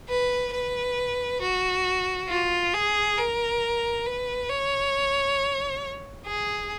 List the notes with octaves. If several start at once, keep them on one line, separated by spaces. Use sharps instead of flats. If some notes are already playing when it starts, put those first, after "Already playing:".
B4
B4
F#4
F4
G#4
A#4
B4
C#5
G#4